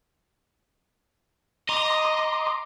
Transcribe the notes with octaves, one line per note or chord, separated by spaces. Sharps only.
D#5 A#5 C6 D6